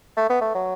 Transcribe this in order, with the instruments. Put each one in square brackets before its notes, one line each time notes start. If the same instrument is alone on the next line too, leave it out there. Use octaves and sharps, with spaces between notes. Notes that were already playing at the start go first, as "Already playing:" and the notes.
[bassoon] A3
B3
A3
F#3